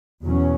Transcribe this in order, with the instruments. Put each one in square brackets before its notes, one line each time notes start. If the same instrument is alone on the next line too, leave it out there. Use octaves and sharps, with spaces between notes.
[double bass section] E2 B2 F#3 C#4